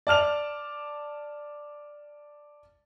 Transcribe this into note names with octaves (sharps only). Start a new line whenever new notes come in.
D5 A5 F6 F7